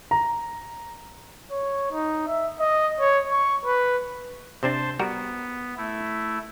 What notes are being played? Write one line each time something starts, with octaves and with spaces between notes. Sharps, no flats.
A#5
C#5
D#4
E5
D#5
C#5
C#6
B4
C3 C4 D4 C5 A5 C6
G3 B3 F#4 A#4
A3 E4